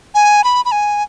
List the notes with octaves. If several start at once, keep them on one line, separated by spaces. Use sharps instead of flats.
G#5
B5
B5
G#5